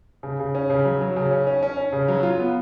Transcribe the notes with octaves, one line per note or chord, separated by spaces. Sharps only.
C#3
C#3
C#4
C#3
F#3
F#3
C#3
C#4
C#4
C#4
C#4
C#3
F#3
F4
B3